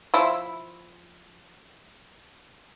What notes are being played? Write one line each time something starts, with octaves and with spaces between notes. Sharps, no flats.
F3 E4